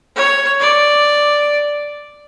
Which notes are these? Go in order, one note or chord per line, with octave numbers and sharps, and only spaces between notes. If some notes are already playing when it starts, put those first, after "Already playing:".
C#5
D5